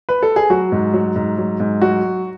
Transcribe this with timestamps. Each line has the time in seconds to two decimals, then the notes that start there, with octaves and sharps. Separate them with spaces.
0.09 B4
0.22 A4
0.36 G#4
0.50 F#3 F#4
0.72 G#2
0.93 F#3
1.16 G#2
1.38 F#3
1.60 G#2
1.82 F#3 F#4